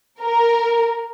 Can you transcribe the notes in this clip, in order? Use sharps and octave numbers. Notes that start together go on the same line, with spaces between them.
A#4